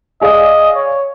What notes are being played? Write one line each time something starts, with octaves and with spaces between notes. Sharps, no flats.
G#4 D5 D#5 F5
C#5